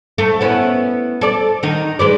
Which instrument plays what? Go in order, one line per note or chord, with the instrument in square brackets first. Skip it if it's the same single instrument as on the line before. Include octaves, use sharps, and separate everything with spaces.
[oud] A3
B3 C#4 E4
A4 D5
D#3 D#4
G#3 B4 D5